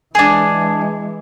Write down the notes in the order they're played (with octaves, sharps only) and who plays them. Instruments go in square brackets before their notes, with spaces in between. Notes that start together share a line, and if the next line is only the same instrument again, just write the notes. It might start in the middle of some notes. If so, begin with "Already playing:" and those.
[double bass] E3 G#3 [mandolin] D4 G#4